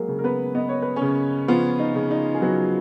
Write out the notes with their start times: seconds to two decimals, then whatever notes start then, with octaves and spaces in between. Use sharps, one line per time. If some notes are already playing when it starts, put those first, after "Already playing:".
Already playing: F#3 G#3 A#3 G#4 A#4
0.08 C#3
0.19 A#4
0.24 B3 B4
0.55 B3 D#5
0.69 C#5
0.82 B4
0.96 C#4 C#5
1.02 C#3
1.48 F3 B3 F4
1.79 D#4
1.95 C#3
2.11 D#4
2.34 G#4
2.42 F#3 B3 F#4